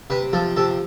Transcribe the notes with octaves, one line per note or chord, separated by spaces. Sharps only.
C3 B4
F3 A4
C3 A4